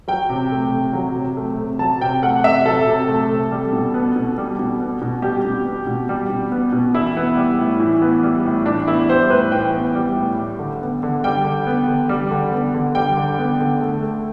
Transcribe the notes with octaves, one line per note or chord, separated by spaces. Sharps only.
F#3 G5
C3
A3
C3
F#3
C3
A3
C3
F#3 A5
C3 G5
A3 F#5
C3 E5
F#3 A4
C3
A3
C3
G3
B2
B3
B2
G3
B2
B3
B2
G3 G4
B2
B3
B2
G3
B2
B3
B2
E3 E4
B3
G3
A2
E3
B3
G3
A2
E3 D4
B3 E4
G3 C5
A2 B4
E3 G5
B3
G3
A2
G3
D3
B3
D3
G3 G5
D3
B3
D3
G3
D3
B3
D3
G3 G5
D3
B3
D3
A3
A3